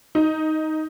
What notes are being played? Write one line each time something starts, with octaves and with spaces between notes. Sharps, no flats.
D#4